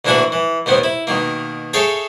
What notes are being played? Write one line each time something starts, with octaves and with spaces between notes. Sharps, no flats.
D2 E3 A#3 D4 F#4 B5
E3
D#2 D#3 B3 C4
E4
B2 D#3 A#3
G#4 A4 C#5 E5 F5 G5